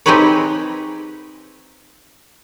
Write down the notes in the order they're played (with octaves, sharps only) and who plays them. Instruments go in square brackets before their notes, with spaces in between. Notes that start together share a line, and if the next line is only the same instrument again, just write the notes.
[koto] C4 D#4 G4 G#4 B4 C#5